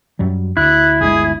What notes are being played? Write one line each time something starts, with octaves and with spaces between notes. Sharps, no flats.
F#2 F#3 G3
D2 E4 F#6
G1 D2 G#3 G#4